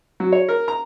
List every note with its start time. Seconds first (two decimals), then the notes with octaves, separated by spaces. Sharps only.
0.20 F#3
0.32 C#5
0.49 A#4
0.68 A#5